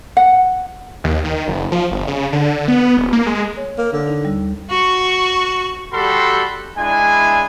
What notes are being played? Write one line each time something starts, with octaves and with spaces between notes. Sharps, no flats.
F#5
D#2
D#3
F#1
F3
G1
C#3
D3
B3
D#1
A#3
G#3
C#5
A#3
D3
D#4
D#2 G3
F#4 C#6
G3 F#4 G4 A4 B5 C6
G#3 D4 E4 G#5